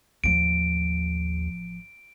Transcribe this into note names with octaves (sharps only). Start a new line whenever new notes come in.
A1 D#2 F3 D7